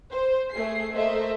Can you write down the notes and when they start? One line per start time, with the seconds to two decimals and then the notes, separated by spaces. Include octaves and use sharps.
0.12 C5
0.53 A3 G#4 C7
0.94 A3 A#3 C5 D#5 E5